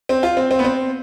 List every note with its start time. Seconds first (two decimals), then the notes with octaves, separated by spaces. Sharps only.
0.09 C4
0.23 F4
0.37 C4
0.51 C4
0.59 B3
0.64 C4